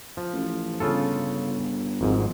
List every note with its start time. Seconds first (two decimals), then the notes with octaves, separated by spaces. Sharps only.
0.17 F3
0.33 A1
0.80 G1 C#3 F4 A4
2.01 G#1 F2 G#2